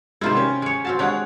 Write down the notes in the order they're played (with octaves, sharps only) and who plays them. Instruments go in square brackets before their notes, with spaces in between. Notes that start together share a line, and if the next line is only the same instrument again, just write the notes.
[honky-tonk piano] C3 D#3 G#3 [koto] E4 F4 C5
[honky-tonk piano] C#4 G4
[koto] G#3 C#5
[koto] C4 F5 A5 [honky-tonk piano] F#4
[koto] G#3 D4 G4 [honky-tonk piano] C#5 F#5